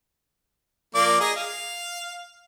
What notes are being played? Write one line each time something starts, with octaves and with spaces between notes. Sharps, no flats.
F3 A#3 D5
G#4 D#5 A#5
F5